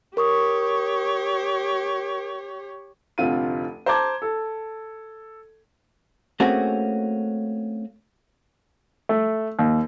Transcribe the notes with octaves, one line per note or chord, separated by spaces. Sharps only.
G4 A#4 C#5 C#6 D#6
F1 D2 C4 F4 D#7
C5 A5 A#5 D6 G#6
A4
A3 A#3 C4 C#4 F#4 G#4
A3
D#2